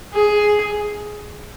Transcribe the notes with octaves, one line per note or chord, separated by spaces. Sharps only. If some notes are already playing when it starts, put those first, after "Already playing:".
G#4